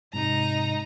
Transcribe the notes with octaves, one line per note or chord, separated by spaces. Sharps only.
G#2 C3 D#4 A#5